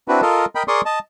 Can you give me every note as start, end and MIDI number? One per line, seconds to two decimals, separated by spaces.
0.08 0.21 60
0.08 0.21 62
0.08 0.21 64
0.08 0.21 66
0.08 0.21 71
0.22 0.45 65
0.22 0.45 69
0.22 0.45 70
0.22 0.45 75
0.55 0.63 70
0.55 0.63 75
0.55 0.63 79
0.55 0.63 83
0.68 0.81 68
0.68 0.81 70
0.68 0.81 74
0.68 0.81 84
0.68 0.81 85
0.68 0.81 87
0.85 0.99 75
0.85 0.99 81